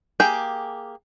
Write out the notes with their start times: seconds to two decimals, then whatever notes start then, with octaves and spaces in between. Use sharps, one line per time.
0.20 A#3 G4 G#4 G5